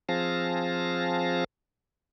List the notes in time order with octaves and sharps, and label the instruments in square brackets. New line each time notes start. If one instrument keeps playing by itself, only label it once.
[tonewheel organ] F3 C4 G#4 F5 A5 A#6